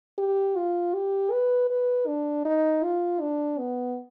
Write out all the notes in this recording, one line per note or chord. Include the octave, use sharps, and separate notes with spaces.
G4
F4
G4
B4
B4
D4
D#4
F4
D4
B3